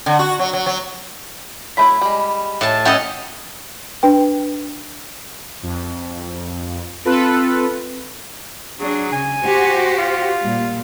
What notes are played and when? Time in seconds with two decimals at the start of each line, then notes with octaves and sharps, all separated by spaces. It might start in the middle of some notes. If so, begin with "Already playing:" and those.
0.06 D3
0.19 F#4
0.39 F#3
0.53 F#3
0.66 F#3
1.77 F#3 A3 E4 B5 B6
2.02 G3 G#3
2.61 A2 A5
2.85 C#4 E4 A4 D#5 F#5 G5
4.03 D4 B4 G5
5.63 F2
7.05 C4 F4 A4 B4
8.80 F#3 D4 G#4
9.12 C#3 G#5
9.43 F#4 G4 C5
9.98 F4
10.40 A#2 G3